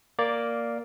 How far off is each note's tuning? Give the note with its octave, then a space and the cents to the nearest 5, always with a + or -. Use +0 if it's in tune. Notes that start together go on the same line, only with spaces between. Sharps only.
A#3 +0 D5 +0